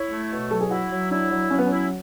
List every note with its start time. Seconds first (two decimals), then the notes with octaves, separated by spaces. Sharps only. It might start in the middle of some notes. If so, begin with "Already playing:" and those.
Already playing: E4 C#5
0.09 A3
0.30 B2
0.50 F#3 A4
0.61 G#4
0.70 E4 F#4
0.91 F#3
1.11 D4 E4
1.31 F#3
1.50 F#3 C#4
1.58 B3
1.66 C#4 E4